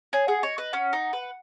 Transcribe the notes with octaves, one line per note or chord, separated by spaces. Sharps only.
G#4 C#5
G#4 F#5
F#5
C#5 D#5
B4 D#5
C#4 F#5
D#4
B4
F#5